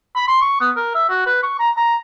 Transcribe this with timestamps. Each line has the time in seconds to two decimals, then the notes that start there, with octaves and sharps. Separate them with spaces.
0.15 B5
0.27 C6
0.41 C#6
0.60 B3
0.76 A#4
0.94 E5
1.09 F#4
1.26 B4
1.43 C#6
1.59 A#5
1.77 A#5